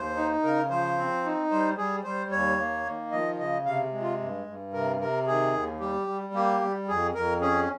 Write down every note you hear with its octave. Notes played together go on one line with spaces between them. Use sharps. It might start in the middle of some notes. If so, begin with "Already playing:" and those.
Already playing: D#2 C5
D#4
C#3 A#4
F3 C5
C4
D#4
G3 C5
G3 G#4
G3 C5
D#2 C#5
A#3
D#3
F3 D#5
C#3 D#5
C3 F5
G#3
F4
G2
G2
C3 A#4
C3 A#4
D#3 G#4
D#2
G3 G4
G3
A#3 G4
G3
F2 G#4
F2 A#4
C#4 G#4